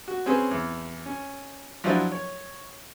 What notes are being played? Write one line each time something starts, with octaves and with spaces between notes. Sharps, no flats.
F#4
C4 C#4 G#4 B4
E2
C#4
F3 F#3 D4 E4 F#4 C5
C#5